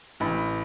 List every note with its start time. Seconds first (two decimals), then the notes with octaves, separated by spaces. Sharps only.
0.20 A1 B5